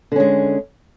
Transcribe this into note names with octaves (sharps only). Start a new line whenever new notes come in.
D3 G#3 C#4